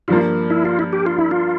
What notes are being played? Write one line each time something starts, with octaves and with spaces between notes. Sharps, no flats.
G2 F3 A#3 F4
E4
F4
E4
G4
F4
E4
F4